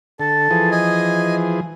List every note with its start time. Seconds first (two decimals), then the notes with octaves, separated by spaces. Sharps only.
0.20 D3 A4
0.51 E3 F3 G#4
0.71 D#5 G#5